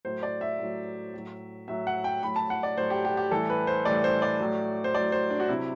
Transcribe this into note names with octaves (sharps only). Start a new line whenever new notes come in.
A2 F#3 C5
D5
E5
A2 F#3
A2 F#3
A2 F#3 E5
F#5
G5
A2 F#3 B5
A5
F#5
D5
A2 F#3 C5
G4
G4
G4
A2 E3 G3 A4
B4
C5
A2 E3 G3 D5
C5
D5
A2 F#3
C5
A2 F#3 D5
C5
D4
F#4
C3 F#3 E4